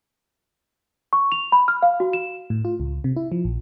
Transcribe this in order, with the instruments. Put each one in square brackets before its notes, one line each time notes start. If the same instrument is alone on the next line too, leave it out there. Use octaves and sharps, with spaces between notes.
[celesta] C#6
F7
B5
F6
F5
F#4
E7
[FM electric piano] A2
F4
C#2
C3
E4
F3
A#1